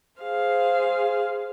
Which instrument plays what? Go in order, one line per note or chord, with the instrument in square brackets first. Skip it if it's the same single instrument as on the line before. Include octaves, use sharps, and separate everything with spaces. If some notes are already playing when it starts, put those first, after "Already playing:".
[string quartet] G#4 C5 F5